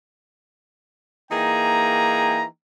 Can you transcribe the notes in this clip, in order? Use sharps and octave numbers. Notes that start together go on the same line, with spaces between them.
E3 A#3 D#4 G#4 G5 A#5